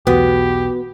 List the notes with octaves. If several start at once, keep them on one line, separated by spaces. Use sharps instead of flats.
B1 E2 B3 F#4 G4